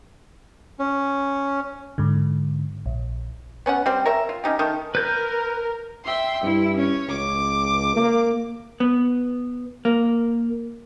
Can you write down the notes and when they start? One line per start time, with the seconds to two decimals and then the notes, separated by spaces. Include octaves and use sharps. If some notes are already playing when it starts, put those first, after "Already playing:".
0.79 C#4
1.98 G#2 D3
2.86 A#1
3.66 B3 C#4 A#4 F#5
3.86 G3 C4
4.06 A#4 C#5 E5
4.29 F4
4.44 C#4 D#4 G4
4.59 D#3 A3
4.95 A#4 B4 G6
6.04 E5 G5 C6
6.43 G2 E4
6.76 C#4 C#5
7.09 C#2 D6
7.96 A#3
8.80 B3
9.85 A#3